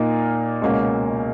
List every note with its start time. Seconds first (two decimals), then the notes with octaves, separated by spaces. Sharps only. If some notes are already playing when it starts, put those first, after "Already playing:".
Already playing: A#2 A#3 D#4
0.62 C#2 B2 A#3 C#4